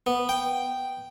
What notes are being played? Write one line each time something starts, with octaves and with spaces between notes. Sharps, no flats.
B3
G5